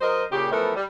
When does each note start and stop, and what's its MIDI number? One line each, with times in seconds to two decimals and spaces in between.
0.01 0.24 54
0.01 0.24 70
0.01 0.24 72
0.01 0.24 75
0.32 0.51 46
0.32 0.51 49
0.32 0.51 67
0.52 0.74 52
0.52 0.74 53
0.52 0.74 57
0.52 0.74 59
0.52 0.74 69
0.52 0.74 70
0.76 0.84 55